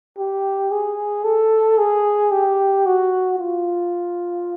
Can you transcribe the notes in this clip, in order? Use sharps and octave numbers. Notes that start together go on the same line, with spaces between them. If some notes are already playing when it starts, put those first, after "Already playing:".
G4
G#4
A4
G#4
G4
F#4
F4